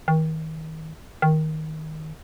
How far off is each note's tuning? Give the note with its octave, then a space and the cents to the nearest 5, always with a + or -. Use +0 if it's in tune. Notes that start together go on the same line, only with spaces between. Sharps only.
D#3 +35
D#3 +10